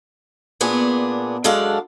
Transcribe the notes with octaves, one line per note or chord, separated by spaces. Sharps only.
A#2 B3 D4 G#4
F#2 G#3 D4 A4 F5 F#5